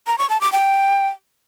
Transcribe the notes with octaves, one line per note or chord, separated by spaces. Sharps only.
A#5
C#6
A5
D6
G5